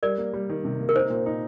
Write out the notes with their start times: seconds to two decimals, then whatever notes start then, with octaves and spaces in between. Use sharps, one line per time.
0.03 G3 A#4 D5
0.18 A#3
0.33 G3
0.49 D#3
0.65 C3
0.80 A#3
0.89 A#4
0.95 D#4 C5
1.10 A#2
1.26 D#4